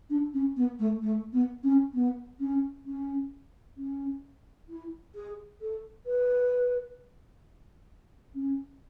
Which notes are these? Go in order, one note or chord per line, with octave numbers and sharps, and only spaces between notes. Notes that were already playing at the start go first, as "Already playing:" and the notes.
D4
C#4
B3
A3
A3
B3
C#4
B3
C#4
C#4
C#4
E4
G#4
A4
B4
C#4